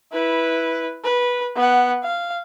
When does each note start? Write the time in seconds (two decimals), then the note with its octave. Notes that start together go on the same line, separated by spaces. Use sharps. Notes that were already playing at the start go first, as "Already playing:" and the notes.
0.13 E4 B4
1.04 B4
1.56 B3 F#5
2.03 F5